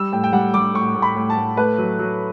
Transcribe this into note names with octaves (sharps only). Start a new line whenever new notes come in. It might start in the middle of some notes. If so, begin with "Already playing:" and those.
Already playing: G3 E6
A2 G5
G5
G3 F#5
G3 D6
A2 C#6
A2
B5
A2
A5
A2
A3 B4
F#3
F#3